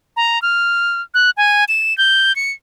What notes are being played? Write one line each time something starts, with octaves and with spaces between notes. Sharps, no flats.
A#5
F6
F#6
G#5
E7
G6
C#7